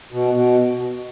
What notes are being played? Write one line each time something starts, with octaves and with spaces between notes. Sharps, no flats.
B2
B2